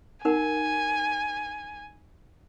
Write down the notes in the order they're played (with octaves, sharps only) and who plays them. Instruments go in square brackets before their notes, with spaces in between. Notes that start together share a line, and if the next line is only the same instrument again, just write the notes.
[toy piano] D#4 A#4 F#5 [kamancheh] G#5